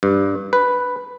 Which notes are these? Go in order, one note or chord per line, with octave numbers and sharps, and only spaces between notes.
G2
B4